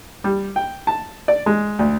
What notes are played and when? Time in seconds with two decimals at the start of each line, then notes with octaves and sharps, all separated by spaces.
0.24 G3
0.56 G5
0.87 A5
1.28 D5
1.46 G#3
1.79 D2